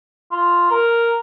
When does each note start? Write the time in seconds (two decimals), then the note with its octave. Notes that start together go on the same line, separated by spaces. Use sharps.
0.32 F4
0.71 A#4